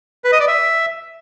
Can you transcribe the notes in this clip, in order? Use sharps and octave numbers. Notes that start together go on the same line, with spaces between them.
B4
D#5
D5
E5